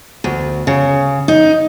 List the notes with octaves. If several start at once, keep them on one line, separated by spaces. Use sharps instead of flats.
D2
C#3
D#4